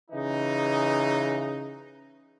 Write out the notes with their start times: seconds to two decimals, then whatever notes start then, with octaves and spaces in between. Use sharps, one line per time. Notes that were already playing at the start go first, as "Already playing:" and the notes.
0.11 C#3 E3 D#4